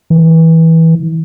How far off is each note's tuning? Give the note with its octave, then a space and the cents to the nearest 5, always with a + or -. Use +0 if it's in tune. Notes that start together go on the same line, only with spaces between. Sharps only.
E3 -20